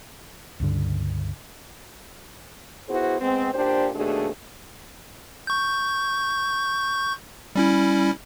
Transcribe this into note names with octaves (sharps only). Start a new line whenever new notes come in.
C#2 G2 D3
B3 E4 F#4 G#4 C5
G#3 B3 C4
A#2 D4 G4 C5
D#2 B2 A3 D4 G#4
C#6 G6
G3 C#4 E4